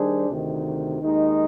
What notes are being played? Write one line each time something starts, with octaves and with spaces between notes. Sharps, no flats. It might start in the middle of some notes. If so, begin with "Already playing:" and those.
Already playing: D#3 G3 D4 G#4 C5
D2 C3 D#3
D#2 D#3 G#3 D#4